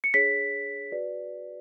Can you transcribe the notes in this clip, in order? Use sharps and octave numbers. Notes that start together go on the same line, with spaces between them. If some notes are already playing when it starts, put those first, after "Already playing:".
C#7
D4 G#4 C#5 B6
F#4 B4 D5